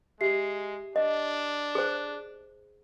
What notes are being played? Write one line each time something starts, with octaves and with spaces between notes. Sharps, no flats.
G#3 G4 E5 C7
D4 D#5
G#4 C5